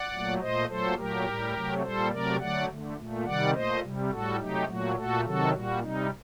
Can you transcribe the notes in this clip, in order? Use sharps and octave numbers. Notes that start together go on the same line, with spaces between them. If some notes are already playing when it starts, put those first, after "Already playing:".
Already playing: D5 F#5
A#2 F#3 A3
A#2 A3 C5 D#5
A#2 F#3 A3 A4 C5
A#2 F#3 A3 G4 A#4
A2 G3
C3 F#3 A3
A#2 G3 A4 C5
C3 F#3 A3 A#4 D5
D3 F#3 A3 D5 F#5
D3 A3
A#2 A3
C3 D#3 G3 D5 F#5
A#2 A3 C5 D#5
C3 G3
A2 G3 F#4 A4
C3 F#3 A3 D#4 G4
A#2 F#3 A3 F#4
A#2 A3 F#4 A4
C3 D#3 F#3 F#4 A4
A#2 G3 F#4
C3 G3 D#4